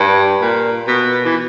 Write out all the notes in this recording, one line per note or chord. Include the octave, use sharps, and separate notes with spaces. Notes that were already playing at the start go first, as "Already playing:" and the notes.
Already playing: G2
A#2
B2
E3